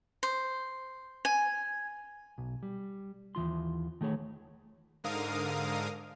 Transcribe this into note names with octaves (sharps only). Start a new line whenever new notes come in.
C5
G#5
B1
G3
D#2 E3 F4 C6
D#3 A3 G#4 C#5
G#2 D3 A#4 F5 D#6